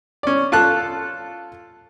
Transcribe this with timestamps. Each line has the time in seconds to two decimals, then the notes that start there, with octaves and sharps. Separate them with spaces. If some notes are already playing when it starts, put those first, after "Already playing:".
0.23 C#4 D5
0.52 F4 A4 A5 F#6